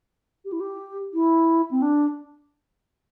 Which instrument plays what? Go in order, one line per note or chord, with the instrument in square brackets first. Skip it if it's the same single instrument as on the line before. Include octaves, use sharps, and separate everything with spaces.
[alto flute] G4
E4
G4
E4
C4
D4